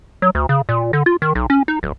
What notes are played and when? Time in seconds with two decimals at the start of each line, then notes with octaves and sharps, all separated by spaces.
0.22 F#3
0.35 D2
0.49 C#3
0.69 A#2
0.93 D3
1.06 F4
1.22 D#3
1.35 B1
1.50 C#4
1.68 D#4
1.83 D1